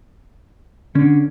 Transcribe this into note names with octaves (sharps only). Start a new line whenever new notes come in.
D3 C#4